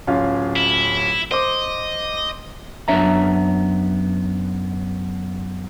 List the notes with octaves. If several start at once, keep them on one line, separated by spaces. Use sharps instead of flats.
D1 C#4 F4
E4
C5 D#5 D6
F#2 B3 D4 C#5 E5 A#5